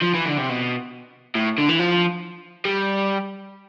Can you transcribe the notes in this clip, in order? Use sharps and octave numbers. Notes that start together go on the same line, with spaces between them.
F3
E3
D3
C3
B2
A2
D3
E3
F3
G3